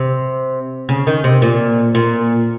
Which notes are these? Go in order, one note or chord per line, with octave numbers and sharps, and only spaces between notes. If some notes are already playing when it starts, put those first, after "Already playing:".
Already playing: C3
C#3
D#3
C3
A#2
A#2